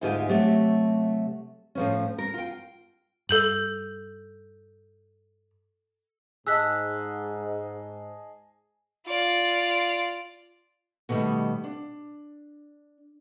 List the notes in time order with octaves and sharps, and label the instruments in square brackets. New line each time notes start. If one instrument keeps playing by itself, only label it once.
[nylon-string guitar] D2 G#2 D#4 F4 G4 G#5
C3 F#3 A3 G4
A2 F3 C#4
A#4
F4 G5
[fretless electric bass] G2 [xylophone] A4 G6 F#7
[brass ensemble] G#2 [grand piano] G#4 D#5 A5 [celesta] E6 F#6 B6
[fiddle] F4 D5
[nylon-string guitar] B2 D3 D#3 G3 A3
D4